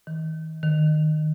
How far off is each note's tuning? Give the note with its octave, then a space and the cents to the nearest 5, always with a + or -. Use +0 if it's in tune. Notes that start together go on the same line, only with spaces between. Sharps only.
D#3 +35
D#3 -10